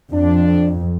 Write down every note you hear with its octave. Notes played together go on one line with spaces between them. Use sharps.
F2 D4